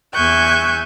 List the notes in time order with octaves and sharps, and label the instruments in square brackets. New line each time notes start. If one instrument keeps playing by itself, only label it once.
[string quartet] E2 E5 G#5 C#6 F#6 G6